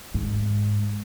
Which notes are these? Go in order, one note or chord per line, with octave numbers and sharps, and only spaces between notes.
G#2